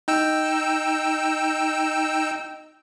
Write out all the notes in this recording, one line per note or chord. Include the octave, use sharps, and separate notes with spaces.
D#4 G5 E6